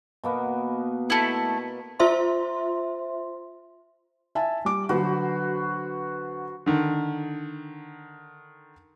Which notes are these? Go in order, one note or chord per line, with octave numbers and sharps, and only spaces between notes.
B2 A#3 B3
A3 E4
F4 C5 E5 C6
E5 G#5 A5
G3 D6
D3 F#3 F#4 B4 C5
D3 D#3